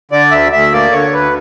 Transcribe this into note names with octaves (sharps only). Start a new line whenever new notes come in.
D3 D5
D2 E5
D2 E5
A#3 D5
D3 C#5
D2 B4